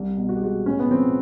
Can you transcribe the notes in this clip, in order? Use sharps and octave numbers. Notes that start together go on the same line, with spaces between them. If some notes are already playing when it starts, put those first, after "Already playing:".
Already playing: C2
B2
F#4
G4
G#3 F#4
A2 C#4
B3
F3 C4